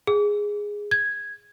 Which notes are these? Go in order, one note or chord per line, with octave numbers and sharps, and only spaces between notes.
G#4
G#6